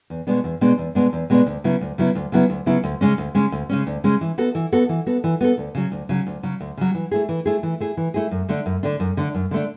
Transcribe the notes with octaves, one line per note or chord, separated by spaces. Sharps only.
E2
B2 G#3 B3 D4
E2
B2 G#3 B3 D4
E2
B2 G#3 B3 D4
E2
B2 G#3 B3 D4
D2
C#3 F#3 B3 E4
D2
C#3 F#3 B3 E4
D2
C#3 F#3 B3 E4
D2
C#3 F#3 B3 E4
D2
C#3 G#3 C#4
D2
C#3 G#3 C#4
D2
C#3 G#3 C#4
D2
C#3 G#3 C#4
E3
B3 F#4 A4
E3
B3 F#4 A4
E3
B3 F#4 A4
E3
B3 F#4 A4
D2
C#3 F#3
D2
C#3 F#3
D2
C#3 F#3
D2
C#3 F#3
E3
A3 E4 G#4
E3
A3 E4 G#4
E3
A3 E4 G#4
E3
A3 E4 G#4
F#2
D3 A3 D4
F#2
D3 A3 D4
F#2
D3 A3 D4
F#2
D3 A3 D4